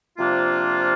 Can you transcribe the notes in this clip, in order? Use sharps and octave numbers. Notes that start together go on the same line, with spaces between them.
C3 F3 A#3 D4 F4